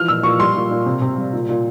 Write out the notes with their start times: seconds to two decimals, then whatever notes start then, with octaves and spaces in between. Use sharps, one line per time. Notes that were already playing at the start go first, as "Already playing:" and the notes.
Already playing: E3 F3 F6
0.08 A#2 E6
0.23 A#2 C#6
0.40 G3 C6
0.56 A#2
0.71 A#2
0.86 C3
1.02 C3
1.18 G3
1.33 A#2
1.49 A#2